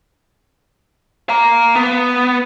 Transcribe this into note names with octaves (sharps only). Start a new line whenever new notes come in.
F5 A#5
B3